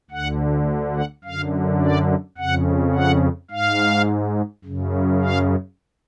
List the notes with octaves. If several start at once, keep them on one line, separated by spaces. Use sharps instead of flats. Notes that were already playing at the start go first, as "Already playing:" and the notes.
D2 D3 F#5
F#5
F#2 D3 F5
D5
F2 C#3 F#5
F#5
G#2 F5
F#2 C#3
F5